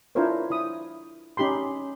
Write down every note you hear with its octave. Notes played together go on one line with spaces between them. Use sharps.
D4 E4 F4 A#4 C5 C#5
E4 B5 D#6
C#4 D#4 G4 B5 C6